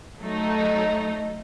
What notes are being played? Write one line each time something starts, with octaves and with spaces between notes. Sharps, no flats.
F#3 A3 D#4